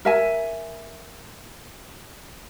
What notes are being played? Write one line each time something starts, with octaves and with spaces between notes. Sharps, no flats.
A#4 E5 G#5